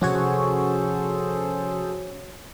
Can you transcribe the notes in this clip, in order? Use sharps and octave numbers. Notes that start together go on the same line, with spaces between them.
C3 F3 C#4 F#4 G#4 A4 C5 C#5